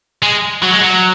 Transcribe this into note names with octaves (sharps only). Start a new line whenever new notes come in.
G#3
F#3
G#3
F#3